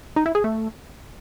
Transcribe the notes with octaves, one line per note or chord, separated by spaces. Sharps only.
D#4
E4
G#4
A3